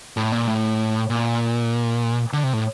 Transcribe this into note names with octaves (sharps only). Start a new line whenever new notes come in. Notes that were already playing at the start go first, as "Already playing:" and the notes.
A2
A#2
A2
A#2
D3
C3
A2